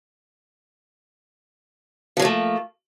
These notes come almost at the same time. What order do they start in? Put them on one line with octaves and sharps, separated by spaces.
F3 F#3 A#3 A3